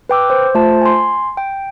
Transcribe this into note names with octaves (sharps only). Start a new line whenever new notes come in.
B4 G5 D6 E6
C5
A3 F4 C5 A5
G#5 C6
G5